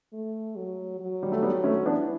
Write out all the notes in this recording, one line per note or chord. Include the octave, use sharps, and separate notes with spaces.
A3
F#3
F#3
G3
A3
G3 B3
A3 C#4
E3 B3 D4